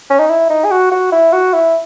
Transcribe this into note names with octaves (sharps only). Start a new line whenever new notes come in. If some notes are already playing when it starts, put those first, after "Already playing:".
C#4
D#4
E4
D#4
G#4
F#4
F#4
E4
F#4
E4